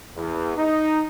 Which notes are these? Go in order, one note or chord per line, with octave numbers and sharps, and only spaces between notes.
E2
D#4